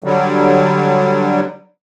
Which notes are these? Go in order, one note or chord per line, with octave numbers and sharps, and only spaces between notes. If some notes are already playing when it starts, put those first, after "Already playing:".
D3 F#3 G3